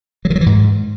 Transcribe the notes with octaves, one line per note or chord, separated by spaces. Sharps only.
F#3
D#3
F#3
E3
G#2